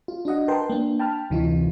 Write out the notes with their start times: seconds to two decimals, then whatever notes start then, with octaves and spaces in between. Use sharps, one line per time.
0.08 F4
0.25 D4 F#4 D#5 F#5
0.48 A#4 B4 G5 A5 C6
0.70 A#3 D4
0.99 G5 A5 B5 F6
1.30 D2 C3 E3 D#4 F4